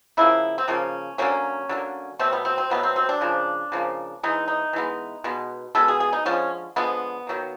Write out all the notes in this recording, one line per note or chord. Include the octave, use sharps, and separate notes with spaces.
C#3 F3 A#3 E4
C4
C#3 F3 A#3 C#4
D3 F#3 A#3 C#4
D3 F#3 A#3
B2 F#3 A3 C4
B3
C4
C4
B2 F#3 A3 B3
C4
C4
D4
C#3 F3 A#3
C#3 F3 A#3
E3 G#3 B3 D#4
D#4
E3 G#3 B3
B2 G#3 B3
B2 G#3 B3 A4
G#4
G#4
D#4
D3 F3 G#3 C#4
D3 F3 G#3 B3
D#3 F#3 A#3